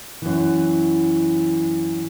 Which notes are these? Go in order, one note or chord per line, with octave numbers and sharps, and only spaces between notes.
F#2 E3